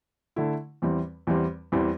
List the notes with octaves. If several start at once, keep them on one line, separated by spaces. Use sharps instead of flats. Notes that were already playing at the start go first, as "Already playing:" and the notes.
D3 A3 E4
E2 E3 G3 C4
E2 E3 G3 C4
E2 E3 G3 C4